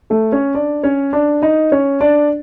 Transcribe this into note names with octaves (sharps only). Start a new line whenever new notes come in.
A3 A4
C#4 C#5
D4 D5
C#4 C#5
D4 D5
D#4 D#5
C#4 C#5
D4 D5